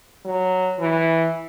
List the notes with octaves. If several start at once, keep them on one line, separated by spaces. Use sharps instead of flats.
F#3
E3